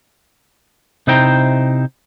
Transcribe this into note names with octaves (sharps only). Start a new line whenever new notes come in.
C3 D#4 E4 C5 G5 A#5